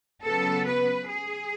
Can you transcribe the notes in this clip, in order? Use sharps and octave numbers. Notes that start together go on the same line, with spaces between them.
C#3 F#3 B3 A4
B4
G#4